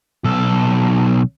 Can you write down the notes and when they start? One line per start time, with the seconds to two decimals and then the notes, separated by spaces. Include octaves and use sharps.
0.24 B1 A4